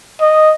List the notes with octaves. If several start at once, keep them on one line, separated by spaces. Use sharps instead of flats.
D#5